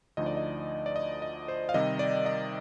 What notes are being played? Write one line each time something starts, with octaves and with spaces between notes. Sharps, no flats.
D2 D3 F3 A3 D#4 D#5
D5
D#5
D5
D#5
D#5
C5
F5
C3 D#3 G3 D#5
D5
D#5